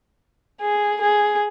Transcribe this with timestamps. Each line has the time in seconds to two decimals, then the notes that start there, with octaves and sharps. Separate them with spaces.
0.62 G#4
1.01 G#4